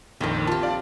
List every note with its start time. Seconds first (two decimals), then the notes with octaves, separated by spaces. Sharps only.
0.21 A#1 F2 D#3 C4 C5
0.47 F4 G4 A5
0.63 D5 F5